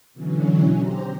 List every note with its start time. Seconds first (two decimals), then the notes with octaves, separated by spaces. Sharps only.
0.14 B2 D3 E3 F#3 C#4
0.77 G4 C5 A#5